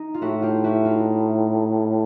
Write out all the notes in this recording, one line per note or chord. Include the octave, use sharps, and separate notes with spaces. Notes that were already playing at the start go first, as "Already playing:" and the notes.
Already playing: D#4
F4
A2 E4 F#4
F4 G4
E4 F#4
D#4 F4